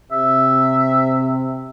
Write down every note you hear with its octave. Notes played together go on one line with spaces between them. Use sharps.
C3 E5